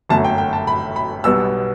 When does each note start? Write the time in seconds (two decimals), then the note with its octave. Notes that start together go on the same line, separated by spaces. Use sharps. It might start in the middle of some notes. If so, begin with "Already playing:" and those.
0.09 G1 F#2 F#3 A3 A5
0.24 G5
0.38 G5
0.53 A5
0.67 B5
0.96 B5
1.24 B1 B2 G3 B3 E6